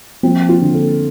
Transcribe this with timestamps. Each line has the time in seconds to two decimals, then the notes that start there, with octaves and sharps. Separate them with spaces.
0.23 F3 C4
0.49 F4
0.61 D3
0.74 A4